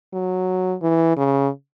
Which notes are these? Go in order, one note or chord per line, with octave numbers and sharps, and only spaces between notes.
F#3
E3
C#3